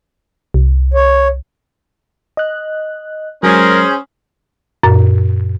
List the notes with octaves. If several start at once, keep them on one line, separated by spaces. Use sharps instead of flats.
C2
C#5
D#5 F#6
F#3 G#3 C#4 G#4 A#4 C5
F#2 A#2